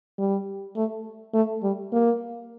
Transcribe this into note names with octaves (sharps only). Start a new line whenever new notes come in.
G3
A3
A3
G3
A#3